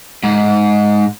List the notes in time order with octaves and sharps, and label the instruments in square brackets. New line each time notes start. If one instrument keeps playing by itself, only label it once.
[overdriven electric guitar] G#2